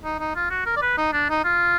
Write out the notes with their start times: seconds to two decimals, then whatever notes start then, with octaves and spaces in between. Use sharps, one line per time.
0.04 D#4
0.20 D#4
0.36 F4
0.50 F#4
0.66 A#4
0.77 D5
0.82 B4
0.97 D#4
1.13 D4
1.30 D#4
1.44 F4